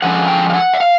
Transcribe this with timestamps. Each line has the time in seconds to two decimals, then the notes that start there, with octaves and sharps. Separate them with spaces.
0.02 F2 D3 F3 G#3 C#4 F#5
0.28 G5
0.50 F5
0.54 F#5
0.74 E5
0.80 F5